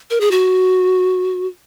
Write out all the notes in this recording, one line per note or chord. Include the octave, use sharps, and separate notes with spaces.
A#4
G#4
F#4